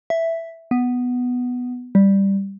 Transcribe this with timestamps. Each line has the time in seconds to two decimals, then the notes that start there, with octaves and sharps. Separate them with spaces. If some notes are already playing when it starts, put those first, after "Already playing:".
0.10 E5
0.71 B3
1.95 G3